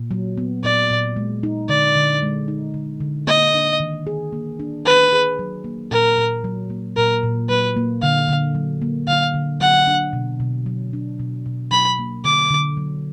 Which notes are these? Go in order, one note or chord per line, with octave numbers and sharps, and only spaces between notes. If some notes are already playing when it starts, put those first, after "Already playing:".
Already playing: A#2
F#3
B3
A#2 D5
A#2
G#3
D#4
D3 D5
D3
G#3
D#4
D3
D3
A#3 D#5
D4
D#3
G#4
A#3
D4
D#3 B4
G#4
F#3
A#3
A#2 A#4
A#2
F#3
A#3
A#2 A#4
A#2
F#3 B4
A#3
D3 F5
D3
F#3
A#3
D3 F5
D3
F#3 F#5
D4
B2
B2
F#3
D4
B2
B2
F#3 B5
A#3
D3 D6
D3
F#3